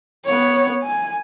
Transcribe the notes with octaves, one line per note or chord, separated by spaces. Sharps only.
B3 C#5
G#5